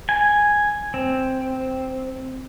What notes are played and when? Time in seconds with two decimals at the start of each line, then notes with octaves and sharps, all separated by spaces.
0.09 G#5
0.94 C4